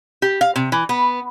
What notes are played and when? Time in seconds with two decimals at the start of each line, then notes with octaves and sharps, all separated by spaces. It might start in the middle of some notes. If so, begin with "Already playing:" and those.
0.22 G4
0.41 F5
0.56 C3
0.72 E3
0.89 B3